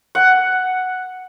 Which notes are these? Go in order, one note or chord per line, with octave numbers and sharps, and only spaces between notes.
F#5